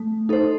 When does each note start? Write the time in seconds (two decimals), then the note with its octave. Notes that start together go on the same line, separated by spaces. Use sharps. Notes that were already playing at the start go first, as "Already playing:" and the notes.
Already playing: A3
0.29 D#4 A4 C5